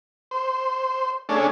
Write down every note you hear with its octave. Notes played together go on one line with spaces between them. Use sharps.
C5
A3 C#4 D4 G#4